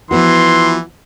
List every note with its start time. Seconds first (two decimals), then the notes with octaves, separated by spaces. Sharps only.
0.11 E3 F3 B3 F#4 C6